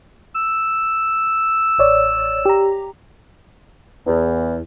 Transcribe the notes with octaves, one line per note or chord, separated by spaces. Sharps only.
E6
A1 C#5 D5
G4 A#5
E2